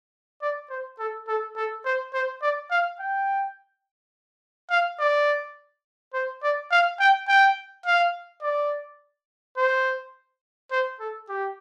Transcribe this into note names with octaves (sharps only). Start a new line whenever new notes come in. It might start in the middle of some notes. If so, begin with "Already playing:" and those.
D5
C5
A4
A4
A4
C5
C5
D5
F5
G5
F5
D5
C5
D5
F5
G5
G5
F5
D5
C5
C5
A4
G4